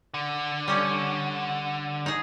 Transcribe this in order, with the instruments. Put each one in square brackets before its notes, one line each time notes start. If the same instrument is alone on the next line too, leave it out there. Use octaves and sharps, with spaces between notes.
[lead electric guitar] D3
[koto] G3 C#4 A4
D#4 G#4